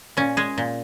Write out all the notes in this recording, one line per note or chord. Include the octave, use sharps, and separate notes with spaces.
A#2 C#4
G#3 G#4
A#2